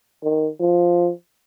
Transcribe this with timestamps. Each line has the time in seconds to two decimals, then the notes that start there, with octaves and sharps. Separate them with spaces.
0.24 D#3
0.60 F3